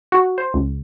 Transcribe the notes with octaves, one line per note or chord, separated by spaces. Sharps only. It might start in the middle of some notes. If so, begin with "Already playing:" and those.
F#4
C5
C#2